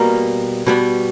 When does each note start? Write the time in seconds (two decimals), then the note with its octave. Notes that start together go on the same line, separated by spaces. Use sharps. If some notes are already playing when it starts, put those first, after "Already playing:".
Already playing: B2 G3 A#3 A#4
0.66 B2 G3 B3